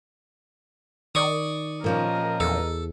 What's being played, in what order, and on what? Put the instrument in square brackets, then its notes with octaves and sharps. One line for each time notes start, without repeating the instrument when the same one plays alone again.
[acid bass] D#3 [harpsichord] D5 C#6 D#6
[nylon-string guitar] A#2 F3 C#4 [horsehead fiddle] A#4 D#5
[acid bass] E2 [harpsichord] A4